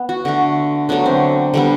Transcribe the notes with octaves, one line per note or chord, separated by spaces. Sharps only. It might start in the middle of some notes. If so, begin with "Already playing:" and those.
Already playing: B3
F#4
D3 A3
D3 F#3 A3 B3
C4
D3 G3 B3